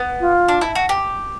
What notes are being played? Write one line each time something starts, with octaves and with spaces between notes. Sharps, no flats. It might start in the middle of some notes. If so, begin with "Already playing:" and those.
Already playing: B3
F4
D4
E4
F#4
G4